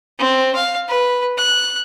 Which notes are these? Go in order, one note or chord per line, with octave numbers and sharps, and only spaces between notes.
C4
F5
B4
F#6